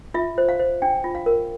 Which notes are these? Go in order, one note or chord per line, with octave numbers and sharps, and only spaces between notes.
F4 E5
C5
F5
C5
D4 G5
F4
F5
A#4